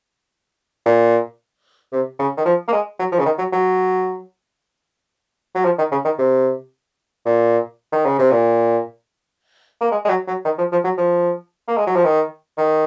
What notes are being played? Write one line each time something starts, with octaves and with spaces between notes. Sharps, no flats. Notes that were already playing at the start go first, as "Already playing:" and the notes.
A#2
C3
C#3
D#3
F3
A#3
G#3
F#3
F3
C#3
D#3
F#3
F#3
F#3
F3
D#3
C#3
D#3
C3
A#2
D#3
C#3
C3
A#2
A#3
G#3
G#3
F#3
F#3
D#3
F3
F3
F#3
F3
A#3
G#3
F#3
F3
D#3
D#3